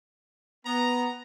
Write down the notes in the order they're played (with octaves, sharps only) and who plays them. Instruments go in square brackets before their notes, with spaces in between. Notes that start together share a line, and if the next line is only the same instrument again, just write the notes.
[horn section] B3 [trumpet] A#5